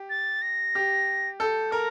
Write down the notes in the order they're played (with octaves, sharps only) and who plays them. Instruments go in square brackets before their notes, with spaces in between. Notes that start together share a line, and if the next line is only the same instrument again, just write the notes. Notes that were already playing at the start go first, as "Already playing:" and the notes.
Already playing: [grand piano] G4
[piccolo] A6
A#6
[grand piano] G4
[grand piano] A4 [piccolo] G6
[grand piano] A#4 [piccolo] A#5